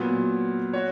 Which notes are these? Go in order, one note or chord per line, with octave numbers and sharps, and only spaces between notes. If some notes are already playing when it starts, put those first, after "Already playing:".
Already playing: A#2 F#3 B3
F#4 C#5